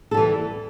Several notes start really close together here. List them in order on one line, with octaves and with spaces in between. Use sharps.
A4 G3 E3